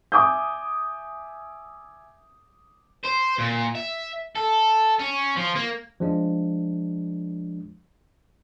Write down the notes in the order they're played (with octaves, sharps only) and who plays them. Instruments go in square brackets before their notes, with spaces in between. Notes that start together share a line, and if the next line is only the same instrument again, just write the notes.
[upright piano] E5 G#5 D6 D#6 G6
[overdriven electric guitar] C5
A#2
E5
A4
C#4
F3
A#3
[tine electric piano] F3 G#3 D4